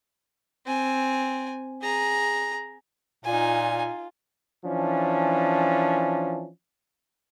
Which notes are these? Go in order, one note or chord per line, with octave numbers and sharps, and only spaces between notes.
C4 G#5
G#4 A#5
A#2 D#4 F4 G#5
E3 F3 C#4 D4